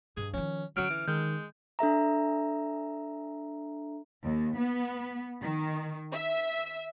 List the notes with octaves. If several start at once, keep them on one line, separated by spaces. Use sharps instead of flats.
G2 G#4
D#3 F3 C#4
D3 F#3 C#4 F6 D7
E3
D#3 G#3 G6
D4 A4 E5 A#5
D#2
B3
D#3
E5